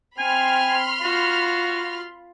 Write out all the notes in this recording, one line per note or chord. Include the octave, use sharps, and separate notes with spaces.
C4 G#5 B5 C6 F6
F4 F#4